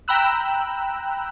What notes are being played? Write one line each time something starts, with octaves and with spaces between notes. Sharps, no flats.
G5 A#5 B5 E6 F#6